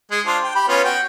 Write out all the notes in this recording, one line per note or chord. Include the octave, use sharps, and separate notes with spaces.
G#3 G#4
D4 F4 C5
G5
G4 B5
B3 C#4 F4
F#4 G5